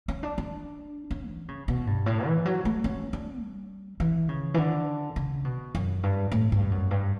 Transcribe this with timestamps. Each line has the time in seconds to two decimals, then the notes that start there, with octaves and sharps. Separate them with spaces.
0.08 C#4
0.23 D4
0.38 D4
1.11 C#4
1.29 E3
1.48 C#3
1.68 B2
1.87 G2
2.06 A2
2.27 E3
2.45 F#3
2.65 A3
2.84 C#4
3.13 D4
3.42 G3
4.00 E3
4.29 C#3
4.54 E3
4.58 D3
5.16 C#3
5.45 B2
5.75 F#2
6.03 G2
6.32 A2
6.52 G2
6.71 F#2
6.91 G2